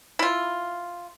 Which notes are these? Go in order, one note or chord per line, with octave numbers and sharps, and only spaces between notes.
E4 F4